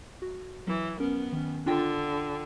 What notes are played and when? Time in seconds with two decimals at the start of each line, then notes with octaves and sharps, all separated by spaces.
0.22 F#4
0.67 E3 F#3
1.00 B3 C#4 A#4
1.33 D#3 C#4
1.66 D3 D4 F4 G5